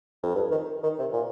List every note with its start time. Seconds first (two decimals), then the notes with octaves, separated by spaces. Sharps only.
0.23 F2
0.35 G2
0.51 D#3
0.83 D#3
0.99 C3
1.12 A#2